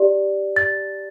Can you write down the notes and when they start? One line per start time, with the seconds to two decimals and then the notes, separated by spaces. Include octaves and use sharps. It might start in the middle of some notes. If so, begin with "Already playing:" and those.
Already playing: G4 D5
0.56 A6